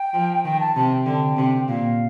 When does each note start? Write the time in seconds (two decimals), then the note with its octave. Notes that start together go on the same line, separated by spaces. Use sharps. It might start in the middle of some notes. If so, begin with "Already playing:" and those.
Already playing: G5
0.14 F3
0.44 D#3 G5
0.60 A5
0.76 C3 A5
0.91 G5
1.06 D3
1.37 C3
1.68 A#2 F5